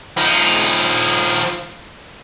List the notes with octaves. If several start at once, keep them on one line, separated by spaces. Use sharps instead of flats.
F3 D#4